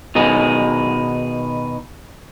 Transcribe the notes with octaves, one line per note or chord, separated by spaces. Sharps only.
B2 D#3 D#4 G#4